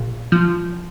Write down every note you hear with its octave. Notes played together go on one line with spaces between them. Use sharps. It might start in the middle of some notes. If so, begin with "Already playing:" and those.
Already playing: A#1
F3